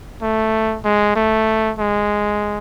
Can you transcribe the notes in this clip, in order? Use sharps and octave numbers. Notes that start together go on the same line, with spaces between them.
A3
G#3
A3
G#3